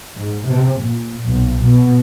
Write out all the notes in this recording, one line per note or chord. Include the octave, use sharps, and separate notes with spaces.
G#2
C3
A#2
B1
B2